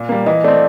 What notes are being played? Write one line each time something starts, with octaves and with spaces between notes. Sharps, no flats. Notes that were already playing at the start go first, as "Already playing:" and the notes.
Already playing: A#2
G3 A#3
E3 D#5
A3 C4 D5